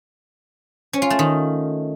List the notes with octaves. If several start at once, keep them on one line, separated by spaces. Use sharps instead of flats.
C#4
F4
A3
D#3